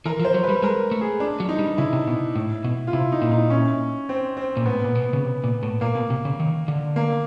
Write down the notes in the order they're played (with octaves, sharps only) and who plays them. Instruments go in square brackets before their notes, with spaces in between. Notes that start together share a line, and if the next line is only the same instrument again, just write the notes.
[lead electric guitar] E3 [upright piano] A#4
[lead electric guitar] F3
[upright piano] C5
[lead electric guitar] F#3
[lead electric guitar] G3 [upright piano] B4
[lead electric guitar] G#3 [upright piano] A#4
[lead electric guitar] A3
[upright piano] G#4
D4
[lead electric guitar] F#3
[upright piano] D#4
[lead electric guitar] G3
[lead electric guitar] C#3 [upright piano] E4
[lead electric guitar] C3
B2
A2
B2
[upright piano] F4
[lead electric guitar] C3 [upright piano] E4
[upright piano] D#4
[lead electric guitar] A#2
[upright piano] D#4
C#4
C4
C4
[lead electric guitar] A#2
[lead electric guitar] A2 [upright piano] B3
[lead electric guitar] A#2
B2
C#3
C3
A#2
A2
[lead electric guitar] A#2 [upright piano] A#3
[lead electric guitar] B2
C3
C#3
D#3
D3
[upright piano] A#3